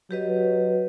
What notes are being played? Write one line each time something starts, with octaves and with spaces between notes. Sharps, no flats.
F#3 G4 B4 D#5